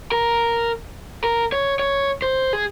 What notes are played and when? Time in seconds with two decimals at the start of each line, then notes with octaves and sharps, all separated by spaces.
0.12 A#4
1.24 A#4
1.52 C#5
1.79 C#5
2.22 C5
2.53 G#4